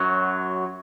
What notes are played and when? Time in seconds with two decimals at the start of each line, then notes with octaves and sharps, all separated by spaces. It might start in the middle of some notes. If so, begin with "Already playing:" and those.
Already playing: F#2 F#3